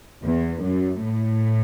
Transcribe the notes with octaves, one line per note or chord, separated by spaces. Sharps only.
E2
F#2
A2